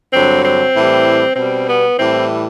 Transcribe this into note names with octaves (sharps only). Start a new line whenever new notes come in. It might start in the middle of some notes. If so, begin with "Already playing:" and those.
G2 D3 F#3 C4
C4
A2 E3 G3
B2 G3 C4
B3
A2 E3 G3 C4